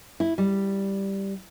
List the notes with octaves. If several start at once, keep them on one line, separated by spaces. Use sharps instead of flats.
E4
G3